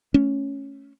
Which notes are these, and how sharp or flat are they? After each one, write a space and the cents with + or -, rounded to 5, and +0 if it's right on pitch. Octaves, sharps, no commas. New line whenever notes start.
A3 +0 C#4 +0